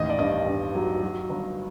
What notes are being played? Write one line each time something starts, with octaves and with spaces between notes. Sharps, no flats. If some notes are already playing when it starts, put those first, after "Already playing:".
Already playing: A1 D#2 D#5
D5
G2 D#5
G2
F#3
F#3
G1